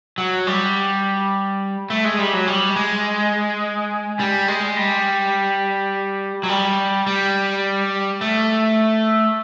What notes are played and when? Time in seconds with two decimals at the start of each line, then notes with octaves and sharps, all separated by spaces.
0.18 F#3
0.47 G3
1.90 A3
2.05 G#3
2.19 G3
2.33 F#3
2.48 G3
2.76 G#3
4.20 G3
4.48 G#3
4.77 G3
6.43 F#3
6.49 G3
7.07 G3
8.21 A3